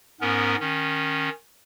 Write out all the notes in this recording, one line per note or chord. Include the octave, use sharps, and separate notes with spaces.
G#2 B3 C#4 A#4
D#3 C#4